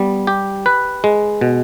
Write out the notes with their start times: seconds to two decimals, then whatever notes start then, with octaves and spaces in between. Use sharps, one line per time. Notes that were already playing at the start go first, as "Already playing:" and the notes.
Already playing: G3 B3
0.27 G4
0.66 B4
1.04 G#3
1.41 B2